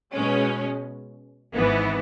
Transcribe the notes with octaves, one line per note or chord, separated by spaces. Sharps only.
B2 G#3 C#4
G#1 G#2 E3 B3 E4